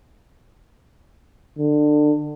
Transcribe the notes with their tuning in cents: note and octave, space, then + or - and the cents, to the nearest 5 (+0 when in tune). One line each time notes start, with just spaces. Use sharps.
D3 +25